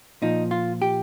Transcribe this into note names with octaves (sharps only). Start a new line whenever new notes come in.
A#2 F3 D#4
F4
G4